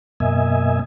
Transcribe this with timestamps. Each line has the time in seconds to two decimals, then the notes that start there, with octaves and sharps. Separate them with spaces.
0.20 F#2 B2 A#3 D#5 E5 G#5